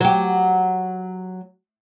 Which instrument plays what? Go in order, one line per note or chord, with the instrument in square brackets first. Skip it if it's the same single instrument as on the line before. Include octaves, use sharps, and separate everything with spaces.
[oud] F#3 G4